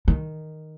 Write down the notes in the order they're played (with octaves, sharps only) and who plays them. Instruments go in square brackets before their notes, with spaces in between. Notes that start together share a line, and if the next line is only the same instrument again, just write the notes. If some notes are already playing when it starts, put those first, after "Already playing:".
[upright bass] D#3